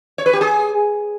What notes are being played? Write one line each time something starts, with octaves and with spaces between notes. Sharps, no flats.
C#5
B4
G4
G#4